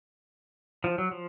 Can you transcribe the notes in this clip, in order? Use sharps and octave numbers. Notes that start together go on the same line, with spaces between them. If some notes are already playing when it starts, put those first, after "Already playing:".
F3
F#3
F3